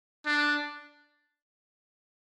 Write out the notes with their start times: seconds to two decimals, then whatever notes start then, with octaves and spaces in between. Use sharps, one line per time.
0.26 D4